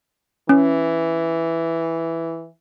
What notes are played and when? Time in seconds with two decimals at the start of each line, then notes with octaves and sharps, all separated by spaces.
0.49 E3 C#4